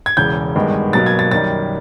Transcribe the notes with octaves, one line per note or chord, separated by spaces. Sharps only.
G#6
E1 E2 C#3 G6
G#1 G2 D#3 G#3 B3
B1 B2 F#3 A#3 A6
G#6
A6
F#2 D#3 G3 A6